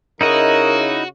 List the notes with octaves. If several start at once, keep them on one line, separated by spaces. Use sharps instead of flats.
C#3 D#4 E4 F#4 A#4 D#5